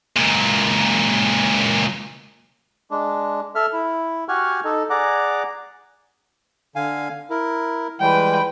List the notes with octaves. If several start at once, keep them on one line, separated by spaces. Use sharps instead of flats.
C#2 A#2
G#3 D4
A4 E5 F6
E4
F#4 G4 F#5 G#5 C#6 F6
D#4 A4
G#4 D5 F#5 A#5 D6
D3 F5 G#5
E4 A#4
E3 G3 G#3 B4 G5